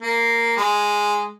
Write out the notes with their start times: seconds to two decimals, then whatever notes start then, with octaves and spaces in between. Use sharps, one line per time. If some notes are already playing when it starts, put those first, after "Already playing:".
0.02 A#3
0.57 G#3